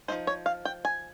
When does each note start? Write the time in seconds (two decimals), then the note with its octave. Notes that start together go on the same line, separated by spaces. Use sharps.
0.08 F3 A#3 D#4 C5
0.27 C#5
0.46 F5
0.65 G5
0.85 G#5